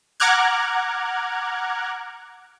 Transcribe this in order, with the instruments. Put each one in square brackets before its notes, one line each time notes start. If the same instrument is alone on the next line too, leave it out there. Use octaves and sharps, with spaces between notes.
[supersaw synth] F#5 A#5 D6 F6 F#6 G#6